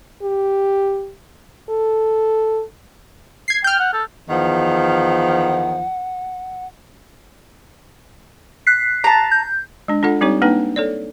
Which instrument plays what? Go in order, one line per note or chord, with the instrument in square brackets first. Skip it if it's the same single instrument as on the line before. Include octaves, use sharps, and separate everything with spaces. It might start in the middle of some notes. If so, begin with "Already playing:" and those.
[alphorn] G4
A4
[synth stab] G#6 C7
[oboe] G5 [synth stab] F6 G6
[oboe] F#5
A4
[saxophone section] E2 D#3 F3 [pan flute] F#5
[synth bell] F#6 B6 C7
[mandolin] A5 A#5
[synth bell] G6
[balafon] G#3 D4
D4 F4 A4 F#5
G3 C4 D#4 G4 C#5
A#3 D4 D#4 B4 G5
A4 C#5 D5